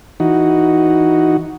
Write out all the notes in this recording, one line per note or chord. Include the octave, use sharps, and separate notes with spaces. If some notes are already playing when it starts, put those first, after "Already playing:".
E3 D#4 F#4